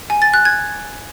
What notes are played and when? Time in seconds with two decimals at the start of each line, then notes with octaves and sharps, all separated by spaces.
0.10 G#5
0.22 A6
0.34 F#6
0.45 G#6